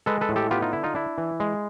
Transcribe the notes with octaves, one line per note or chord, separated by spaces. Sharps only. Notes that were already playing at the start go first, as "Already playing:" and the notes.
G#3 A4 B4
A4 B4
A2
G4 A4
B3 F4 G4
D#4 F4
D3 E4
D#4 F4
D4 E4
E3
G#3